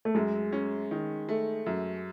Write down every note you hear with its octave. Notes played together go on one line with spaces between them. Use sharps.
A3
F#2 G#3
C#4
D#3
A3
F#2